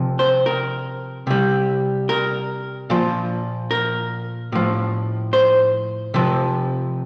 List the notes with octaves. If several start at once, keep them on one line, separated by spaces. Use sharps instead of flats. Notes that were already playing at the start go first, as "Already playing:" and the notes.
Already playing: C3 F3
C5
A#4
C3 G3
A#4
A#2 F3
A#4
A2 F3
C5
C3 F3